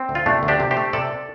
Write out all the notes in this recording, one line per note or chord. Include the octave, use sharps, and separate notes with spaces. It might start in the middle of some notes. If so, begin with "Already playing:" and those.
Already playing: C4
D2
F4
C3 A3 D4
D2
D4 G4
C3
G4 C5
A3
C3 A4 D5